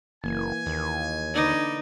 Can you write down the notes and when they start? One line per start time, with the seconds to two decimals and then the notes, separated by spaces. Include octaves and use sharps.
0.24 F#1 E3 A#3 G#5
0.66 D#2
1.35 D3 D#4 B4 D5